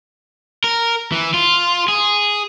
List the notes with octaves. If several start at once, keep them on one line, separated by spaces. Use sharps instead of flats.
A#4
E3
F4
G#4